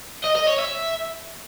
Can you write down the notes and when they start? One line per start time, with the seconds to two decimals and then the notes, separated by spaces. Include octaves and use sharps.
0.24 D#5
0.36 D#5
0.48 C#5
0.59 E5